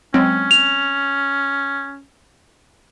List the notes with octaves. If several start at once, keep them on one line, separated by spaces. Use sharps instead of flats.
F#3 G#3 C4 C#4
F7